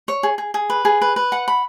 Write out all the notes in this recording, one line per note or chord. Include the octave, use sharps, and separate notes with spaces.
C#5
G#4
G#4
G#4
B4
G#4
B4
B4
F#5
B5